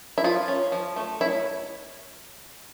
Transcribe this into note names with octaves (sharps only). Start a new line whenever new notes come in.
E4
F3 F4
C#4
F3
A3
C#4 E4